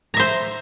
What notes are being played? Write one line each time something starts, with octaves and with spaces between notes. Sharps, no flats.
C5 E5 A#5